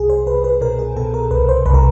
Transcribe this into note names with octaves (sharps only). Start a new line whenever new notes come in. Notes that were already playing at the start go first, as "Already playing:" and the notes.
Already playing: C2 G#4
C5
C2 B4
B4
B2 A#4
G#4
B2 A4
A#4
C2 B4
C5
C2 B4
A#4